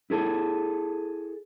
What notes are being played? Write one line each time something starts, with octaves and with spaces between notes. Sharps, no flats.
E4 G#4 A4